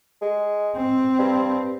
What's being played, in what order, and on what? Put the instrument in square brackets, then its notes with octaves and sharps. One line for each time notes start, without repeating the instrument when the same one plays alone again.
[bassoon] G#3
[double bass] C4
[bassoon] G2